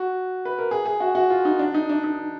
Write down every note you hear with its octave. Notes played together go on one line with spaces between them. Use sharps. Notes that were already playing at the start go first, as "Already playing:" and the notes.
Already playing: F#4
B4
A#4
G#4
G#4
F#4
F#4
F4
D#4
D4
D#4
D4
D#4